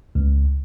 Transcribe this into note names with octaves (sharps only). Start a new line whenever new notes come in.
C#2